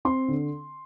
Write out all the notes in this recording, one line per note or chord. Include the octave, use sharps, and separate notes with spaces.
C4 C6
D3